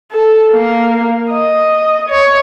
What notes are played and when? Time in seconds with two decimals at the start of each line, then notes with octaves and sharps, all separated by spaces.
0.12 A4
0.52 A#3
1.32 D#5
2.09 C#5